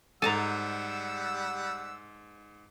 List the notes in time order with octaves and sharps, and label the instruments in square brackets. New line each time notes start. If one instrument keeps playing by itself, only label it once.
[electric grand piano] G#2 D#7 [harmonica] G3 F#5 E6 [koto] A4 A5 A#5